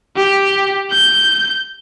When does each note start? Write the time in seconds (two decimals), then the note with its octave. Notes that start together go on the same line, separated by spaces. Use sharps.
0.16 G4
0.91 G6